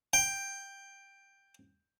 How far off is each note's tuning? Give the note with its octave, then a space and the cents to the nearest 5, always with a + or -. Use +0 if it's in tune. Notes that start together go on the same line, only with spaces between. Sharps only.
G5 +10